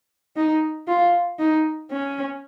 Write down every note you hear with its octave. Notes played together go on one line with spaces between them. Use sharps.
D#4
F4
D#4
C#4